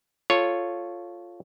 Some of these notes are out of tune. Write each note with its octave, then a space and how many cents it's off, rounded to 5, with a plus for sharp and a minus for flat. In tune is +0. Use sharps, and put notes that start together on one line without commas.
F4 +0 A4 +0 C#5 +0